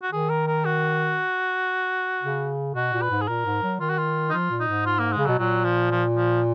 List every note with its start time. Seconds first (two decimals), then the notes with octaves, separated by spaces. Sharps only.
0.03 F#4
0.12 D#3 G#4
0.30 A#4
0.47 A#4
0.65 F#4
2.23 C#3
2.75 B2 F#4
2.93 A#2
3.02 B4
3.10 G#2
3.21 G#4
3.28 A#2 A#4
3.46 G#2
3.63 F#3
3.80 D#3 F4
3.89 F#4
3.98 F4
4.30 D#4
4.33 F3 F4
4.50 A#2
4.60 D#4
4.68 G#2
4.86 F4
4.99 A#3
5.12 G#3
5.17 C#3
5.25 B2 F#3
5.38 A#2 F#3
5.65 F3
5.91 F3
6.16 F3